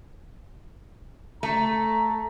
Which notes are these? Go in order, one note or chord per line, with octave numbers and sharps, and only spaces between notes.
A3 A#5